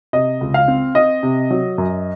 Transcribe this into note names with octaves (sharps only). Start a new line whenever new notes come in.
C3 D#5
C#2
F5
C4
C4 D#5
C3
F#3
F#2